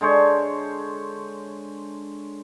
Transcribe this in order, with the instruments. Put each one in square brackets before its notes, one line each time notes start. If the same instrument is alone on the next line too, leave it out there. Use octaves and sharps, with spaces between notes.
[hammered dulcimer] D3 G#3 C5 C#5